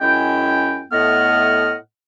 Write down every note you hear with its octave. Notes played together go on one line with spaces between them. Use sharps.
F#2 G#3 C#4 E4 G5
A2 A3 B3 D#5 F#5 F6